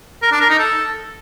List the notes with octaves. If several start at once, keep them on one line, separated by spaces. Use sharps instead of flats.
A#4
D4
A#4
D#4
A4